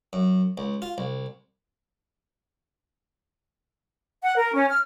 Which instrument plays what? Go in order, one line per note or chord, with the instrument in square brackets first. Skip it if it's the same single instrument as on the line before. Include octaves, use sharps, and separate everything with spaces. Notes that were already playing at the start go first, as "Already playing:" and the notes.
[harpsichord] F#2
C#2
F4
C2
[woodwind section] F#5
A#4
C#4
F6